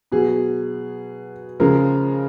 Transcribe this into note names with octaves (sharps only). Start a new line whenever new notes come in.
B2 F#3 G#4
C#3 F3 G#3 A#4